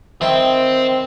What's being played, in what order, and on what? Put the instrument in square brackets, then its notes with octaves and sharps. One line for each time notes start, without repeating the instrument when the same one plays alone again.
[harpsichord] D#3 E4 [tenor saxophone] C4 [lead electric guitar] C5 G5